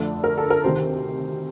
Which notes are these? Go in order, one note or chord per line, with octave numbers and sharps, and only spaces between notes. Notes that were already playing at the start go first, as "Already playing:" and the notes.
Already playing: F2 D3 A3 D4
A#4
A4
A#4
D2 C3 D#3 C5